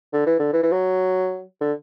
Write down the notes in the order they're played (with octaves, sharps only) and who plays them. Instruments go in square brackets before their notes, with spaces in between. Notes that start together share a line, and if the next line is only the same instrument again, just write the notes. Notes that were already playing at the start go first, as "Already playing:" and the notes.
[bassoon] D3
E3
D3
E3
E3
F#3
D3